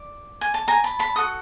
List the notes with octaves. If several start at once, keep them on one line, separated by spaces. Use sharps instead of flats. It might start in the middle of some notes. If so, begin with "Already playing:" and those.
Already playing: D5
G#5
A5
G#5 A#5
A5 B5
A5 B5
F#4 A4 D#6